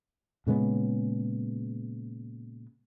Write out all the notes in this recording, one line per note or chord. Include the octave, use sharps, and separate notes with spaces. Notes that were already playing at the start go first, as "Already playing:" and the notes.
A#2 C#3 G#3 B3